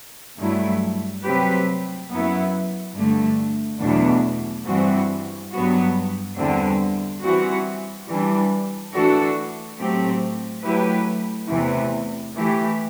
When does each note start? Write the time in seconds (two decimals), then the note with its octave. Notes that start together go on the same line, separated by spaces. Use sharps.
0.38 G2 F#3 A3 E4
1.24 C3 F#3 C4 G4 B4
2.09 F#2 F#3 B3 E4
2.95 G2 D3 A3
3.81 E2 B2 F#3 A3 D4
4.66 G2 E3 G3 C4 F#4
5.52 G2 F#3 B3 F#4
6.36 E2 D3 G3 C4
7.22 E3 G3 C4 F#4
8.08 E3 G3 D4
8.93 E3 A3 D4 F#4 A4
9.79 A2 F#3 A3 C4 G4
10.64 F#3 A3 E4 G4 B4
11.50 E2 C3 E3 A3
12.35 E3 A3 E4 G4